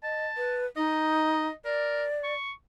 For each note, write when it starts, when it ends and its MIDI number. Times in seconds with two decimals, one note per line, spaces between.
0.03 0.27 75
0.03 0.62 81
0.37 0.66 71
0.76 1.48 63
0.76 1.53 75
1.65 2.05 70
1.65 2.34 74
2.24 2.51 85